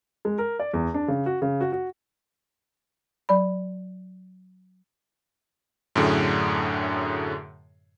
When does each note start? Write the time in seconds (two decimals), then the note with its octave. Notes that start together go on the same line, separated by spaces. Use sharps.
0.25 G#3
0.38 A#4
0.60 D5
0.74 E2
0.94 D4
1.08 C#3
1.26 F#4
1.42 C#3
1.61 F#4
1.72 F#4
3.29 F#3 D5 B5
5.96 F#2 A2 D3 G#4